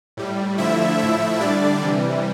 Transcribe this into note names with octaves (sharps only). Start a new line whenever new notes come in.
A2 G3
D3 F3 A3 E4 E5
A2 F3 A3 E4 E5
D3 G3 D4 D5
C3 E3 G3